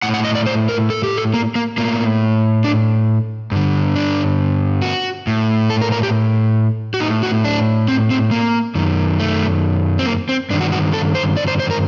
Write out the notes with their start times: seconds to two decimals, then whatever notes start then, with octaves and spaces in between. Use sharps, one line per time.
0.02 A2 F#5
0.14 F#5
0.24 D#5
0.35 D5
0.47 C5
0.69 A#4
0.90 A4
1.04 G4
1.17 A4
1.34 A#3
1.55 A#3
1.78 A2 A#3
2.64 D4
3.51 G2 D3
3.95 D4
4.82 F#4
5.27 A2
5.70 A4
5.82 A#4
5.92 A#4
6.03 G4
6.94 F#4
7.00 A2 D#4
7.23 F#4
7.45 D4
7.88 C4
8.11 C4
8.31 A#3
8.75 F#2 D#3
9.20 A3
9.99 C4
10.06 A#3
10.29 C4
10.50 G2 D4
10.53 D#3
10.61 F#4
10.72 F#4
10.93 A4
11.15 C5
11.37 D5
11.48 C5
11.60 C5
11.71 A#4